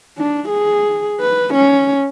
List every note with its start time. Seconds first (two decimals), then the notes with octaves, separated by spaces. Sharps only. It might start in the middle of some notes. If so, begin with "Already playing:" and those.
0.18 D4
0.49 G#4
1.20 B4
1.54 C#4